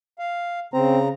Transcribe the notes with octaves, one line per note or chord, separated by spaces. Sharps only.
F5
C#3 C4 A#5